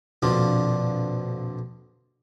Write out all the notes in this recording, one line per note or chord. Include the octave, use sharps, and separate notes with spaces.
A#1 F2 B2 D3 D4 F4